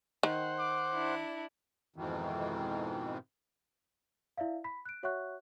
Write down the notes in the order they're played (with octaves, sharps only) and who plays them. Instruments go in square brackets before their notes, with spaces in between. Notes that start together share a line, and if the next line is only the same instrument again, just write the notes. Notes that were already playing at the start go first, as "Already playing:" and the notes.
[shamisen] D#3 [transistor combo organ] C5 F#5
[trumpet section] D6
[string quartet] D4 E4
[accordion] F2 G#2 B2 D#3 E3
[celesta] E4 D5 E5 F5
B5 B6
F#6 D7
F#4 C#5 E5 F#5 C#6 F#6